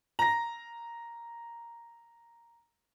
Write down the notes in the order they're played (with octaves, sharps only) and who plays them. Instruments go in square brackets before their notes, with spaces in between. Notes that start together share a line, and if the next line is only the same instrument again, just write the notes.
[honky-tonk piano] A#5 A#6